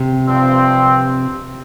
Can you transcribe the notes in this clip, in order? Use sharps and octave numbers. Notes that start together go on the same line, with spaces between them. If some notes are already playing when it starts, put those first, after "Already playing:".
Already playing: C3
G2 F3 C4